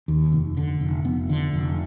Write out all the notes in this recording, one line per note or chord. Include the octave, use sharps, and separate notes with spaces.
D#2
F1
D3
F1
F1 B3
D3
F1